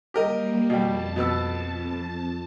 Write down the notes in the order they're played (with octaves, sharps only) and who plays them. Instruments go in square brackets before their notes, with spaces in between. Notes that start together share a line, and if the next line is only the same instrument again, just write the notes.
[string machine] G3 A#3 [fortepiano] G4 A#4 D#5
[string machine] F2 A5 [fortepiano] B2 G3
[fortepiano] B2 B3 E6